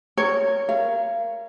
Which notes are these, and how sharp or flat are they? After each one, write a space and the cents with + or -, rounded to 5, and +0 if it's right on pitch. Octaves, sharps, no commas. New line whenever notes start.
A#4 -20 C#5 +0
A#4 +0 F5 -35